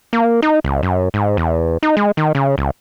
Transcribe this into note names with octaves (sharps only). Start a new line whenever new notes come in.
A#3
D#4
C#2
F#2
G#2
E2
D#4
G#3
D#3
C#3
C#2